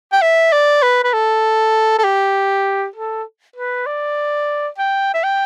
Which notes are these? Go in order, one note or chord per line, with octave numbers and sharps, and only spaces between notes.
G5
E5
D5
B4
B4
A4
A4
G4
A4
B4
D5
G5
E5
G5